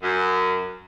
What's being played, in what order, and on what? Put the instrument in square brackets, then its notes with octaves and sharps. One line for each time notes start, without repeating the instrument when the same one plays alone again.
[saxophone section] F#2